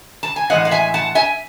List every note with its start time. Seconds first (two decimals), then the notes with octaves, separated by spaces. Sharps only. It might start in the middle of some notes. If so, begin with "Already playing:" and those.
0.23 A5
0.36 G#5
0.50 A2 E3 G#3 D#5 F#5
0.65 F#5
0.71 E5 G#5
0.94 F#5 A5
1.15 E5 G#5